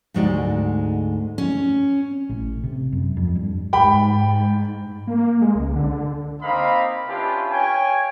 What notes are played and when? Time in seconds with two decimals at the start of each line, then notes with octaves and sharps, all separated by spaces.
0.14 D2 G#2 G#3 D#4 F#4 D5
1.38 C#4
2.29 A1
2.63 C3
2.92 F#2
3.17 F2
3.36 G2
3.73 G#2 G5 B5
5.07 A#3
5.41 G#3
5.56 C#2
5.76 D3
6.42 A#3 C4 D#4 D#5 F5 B5
7.08 C#4 D4 E4 F4 G4 B4
7.50 C#5 F5 G5 G#5